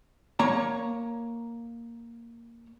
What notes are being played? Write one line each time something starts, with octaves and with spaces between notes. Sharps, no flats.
A#3 C#5 A#5